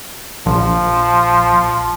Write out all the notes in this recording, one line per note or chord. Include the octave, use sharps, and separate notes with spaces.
A#1 F3